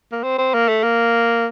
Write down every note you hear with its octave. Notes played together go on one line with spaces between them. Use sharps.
A#3
C4
C4
A#3
A3
A#3